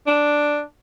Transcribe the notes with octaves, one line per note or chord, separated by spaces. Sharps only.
D4